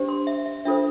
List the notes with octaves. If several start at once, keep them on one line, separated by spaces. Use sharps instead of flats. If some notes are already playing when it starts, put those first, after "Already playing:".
Already playing: D4 G4 C5
C6
E5
E5
D4 F4 A4 C5 E5